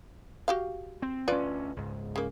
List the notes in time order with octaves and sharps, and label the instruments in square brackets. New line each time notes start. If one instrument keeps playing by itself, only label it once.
[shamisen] F#4 G4 F5
[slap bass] C4
[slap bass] D2 C#4 [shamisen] F4 B4 D5
[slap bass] C#2 G#2
[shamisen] C#3 A#3